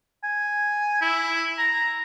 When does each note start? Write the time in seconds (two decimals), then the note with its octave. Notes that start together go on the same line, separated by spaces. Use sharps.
0.24 G#5
1.01 E4
1.58 A#5